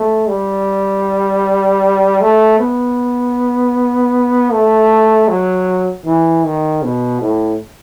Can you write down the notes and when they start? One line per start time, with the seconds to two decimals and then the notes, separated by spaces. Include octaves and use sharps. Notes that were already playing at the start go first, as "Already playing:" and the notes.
Already playing: A3
0.28 G3
2.21 A3
2.59 B3
4.52 A3
5.28 F#3
6.05 E3
6.44 D#3
6.83 B2
7.21 A2